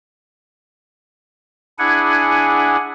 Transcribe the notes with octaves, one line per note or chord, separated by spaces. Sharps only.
D4 E4 G#4 F#5 G#5